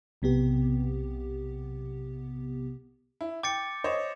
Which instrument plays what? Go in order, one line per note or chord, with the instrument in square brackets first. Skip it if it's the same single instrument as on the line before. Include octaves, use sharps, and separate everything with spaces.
[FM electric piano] B1 C3 B3 G4
[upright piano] E4
[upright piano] G5 [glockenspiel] D6 A6 C#7
[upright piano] C5 C#5 D#5